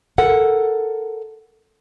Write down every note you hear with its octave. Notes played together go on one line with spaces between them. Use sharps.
A4 A#4 F#5